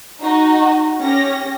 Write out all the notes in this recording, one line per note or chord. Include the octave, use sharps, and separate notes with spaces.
D#4 F#4
C#4 G4 A#6